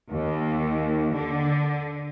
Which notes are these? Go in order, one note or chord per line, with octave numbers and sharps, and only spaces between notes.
D#2
D3